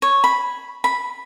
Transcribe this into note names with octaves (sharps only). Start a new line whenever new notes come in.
C#5
B5
B5